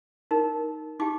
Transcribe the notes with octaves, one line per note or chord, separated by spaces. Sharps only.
D#4 A#4
D#4 G4 D6